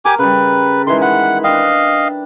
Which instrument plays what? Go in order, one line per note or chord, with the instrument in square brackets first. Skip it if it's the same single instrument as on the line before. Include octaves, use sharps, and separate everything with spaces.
[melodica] G4 G#5 D6 [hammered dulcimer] A#4
[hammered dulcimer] C#3 G3 [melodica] B4
[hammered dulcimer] D#3 E3 G#3 [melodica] C6
[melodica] F#5 [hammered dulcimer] B5
[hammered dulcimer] D4 G5 [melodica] D#5 F5